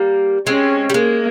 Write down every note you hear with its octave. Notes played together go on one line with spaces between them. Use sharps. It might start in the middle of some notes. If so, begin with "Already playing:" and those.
Already playing: G3 A#3
G#3 C4 C#4
G3
G#3 A#3